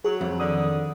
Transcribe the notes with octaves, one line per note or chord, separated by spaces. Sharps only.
F#3 G#4
F2
D3 D#3 D#6